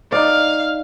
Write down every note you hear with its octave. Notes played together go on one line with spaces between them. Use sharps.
D#4 D5 F5